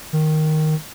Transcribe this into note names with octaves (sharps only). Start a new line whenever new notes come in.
D#3